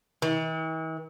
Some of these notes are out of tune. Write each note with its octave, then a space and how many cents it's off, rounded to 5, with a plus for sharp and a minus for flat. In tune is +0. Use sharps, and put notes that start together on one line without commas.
E3 -45